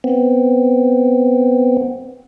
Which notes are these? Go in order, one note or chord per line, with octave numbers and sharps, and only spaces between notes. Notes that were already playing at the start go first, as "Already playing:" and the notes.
B3 C4